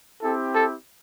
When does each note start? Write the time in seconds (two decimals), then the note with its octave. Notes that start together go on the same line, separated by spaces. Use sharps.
0.22 C4 E4 G4 A4
0.55 A4